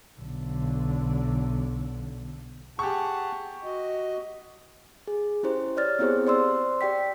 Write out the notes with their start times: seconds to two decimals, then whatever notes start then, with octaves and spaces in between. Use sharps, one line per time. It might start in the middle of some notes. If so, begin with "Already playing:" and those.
0.20 B1 D3
2.79 G4 G#4 F#5 A5 C#6
3.64 F#4 D#5
5.07 G#4
5.43 C#4 E4 G4 C5
5.77 C#5 D5 F6 A6
5.99 B3 C4 E4 G4 G#4 C5
6.27 C5 D5 C6 E6
6.81 G4 D5 G5 B6